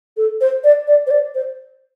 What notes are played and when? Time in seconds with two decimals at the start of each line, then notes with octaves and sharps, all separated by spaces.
0.17 A4
0.41 C5
0.64 D5
0.87 D5
1.07 C5
1.11 D5
1.34 C5